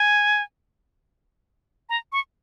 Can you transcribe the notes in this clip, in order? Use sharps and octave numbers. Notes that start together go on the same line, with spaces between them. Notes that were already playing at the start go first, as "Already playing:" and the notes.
Already playing: G#5
A#5
C#6